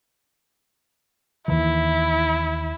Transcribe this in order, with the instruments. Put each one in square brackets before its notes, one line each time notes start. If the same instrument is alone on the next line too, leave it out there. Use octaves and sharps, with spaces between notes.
[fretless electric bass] D#2 D#3 E3 [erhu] E4